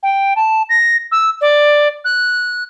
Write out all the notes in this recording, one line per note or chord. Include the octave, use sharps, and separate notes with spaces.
G5
A5
A#6
E6
D5
F#6